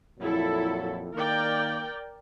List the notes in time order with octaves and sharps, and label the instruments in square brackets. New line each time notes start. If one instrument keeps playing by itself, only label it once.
[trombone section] F2 A#2 F#3 [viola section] E4 A4
[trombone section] D#3 A#3 [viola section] A#4 D5 G5